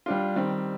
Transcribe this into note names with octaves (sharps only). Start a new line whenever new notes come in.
G3 D4 F4
D#3 G3 C4